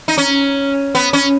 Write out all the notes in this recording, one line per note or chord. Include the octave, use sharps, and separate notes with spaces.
D#4
C#4
B3
C#4